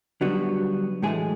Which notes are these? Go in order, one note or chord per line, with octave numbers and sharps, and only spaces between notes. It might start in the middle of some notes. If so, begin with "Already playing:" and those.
D3 F#3 G3 B3 F#4
A2 E3 G#3 A3 G#4